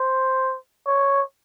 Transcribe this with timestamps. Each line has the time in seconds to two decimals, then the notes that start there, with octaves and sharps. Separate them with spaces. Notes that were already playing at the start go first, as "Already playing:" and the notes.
Already playing: C5
0.87 C#5